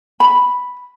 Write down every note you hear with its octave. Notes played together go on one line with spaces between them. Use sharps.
B5